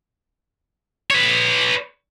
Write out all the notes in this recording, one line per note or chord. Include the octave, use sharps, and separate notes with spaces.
B4 C#5